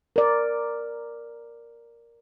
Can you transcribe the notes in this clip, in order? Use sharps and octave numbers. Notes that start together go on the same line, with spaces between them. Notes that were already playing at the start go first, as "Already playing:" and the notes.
A#4 D5